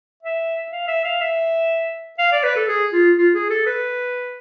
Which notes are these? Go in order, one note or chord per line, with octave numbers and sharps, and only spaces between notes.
E5
F5
E5
F5
E5
F5
D5
B4
A4
G#4
F4
F4
G#4
A4
B4